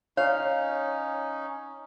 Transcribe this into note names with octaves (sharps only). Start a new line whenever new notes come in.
C#4 D#4 C#5 F5